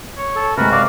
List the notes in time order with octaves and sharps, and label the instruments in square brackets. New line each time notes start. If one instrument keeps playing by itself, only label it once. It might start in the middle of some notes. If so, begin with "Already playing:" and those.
[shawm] C#5
[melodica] A4
[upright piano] C3 G#3 [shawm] F#4 [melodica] A#4 B4
[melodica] D5 F5